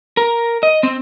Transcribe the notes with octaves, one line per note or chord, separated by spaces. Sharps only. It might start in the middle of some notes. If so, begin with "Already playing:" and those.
A#4
D#5
C4